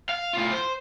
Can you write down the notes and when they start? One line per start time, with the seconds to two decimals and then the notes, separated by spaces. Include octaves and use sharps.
0.09 F5
0.33 A2 F4
0.52 C5